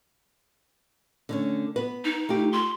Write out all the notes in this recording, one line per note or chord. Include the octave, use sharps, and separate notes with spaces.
D3 A3 C#4
B3 B4
D#4
A3 F4 G4
C6